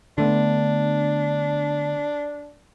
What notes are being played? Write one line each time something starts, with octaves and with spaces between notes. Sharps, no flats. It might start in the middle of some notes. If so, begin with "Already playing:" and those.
D3 A3 B3 D4